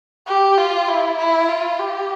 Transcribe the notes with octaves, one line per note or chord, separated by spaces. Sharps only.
G4
F4
E4
E4
F4
G4